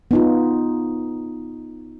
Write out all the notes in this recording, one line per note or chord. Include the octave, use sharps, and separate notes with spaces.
B3 D#4 F4